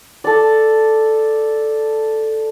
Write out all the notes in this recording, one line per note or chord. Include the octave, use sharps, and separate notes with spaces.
A4 D5